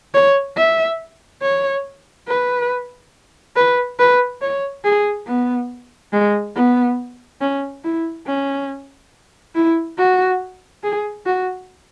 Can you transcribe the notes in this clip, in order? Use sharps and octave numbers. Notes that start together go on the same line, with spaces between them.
C#5
E5
C#5
B4
B4
B4
C#5
G#4
B3
G#3
B3
C#4
E4
C#4
E4
F#4
G#4
F#4